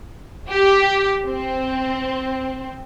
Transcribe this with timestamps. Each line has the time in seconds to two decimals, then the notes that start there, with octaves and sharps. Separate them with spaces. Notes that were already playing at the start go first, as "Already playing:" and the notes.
0.49 G4
1.24 C4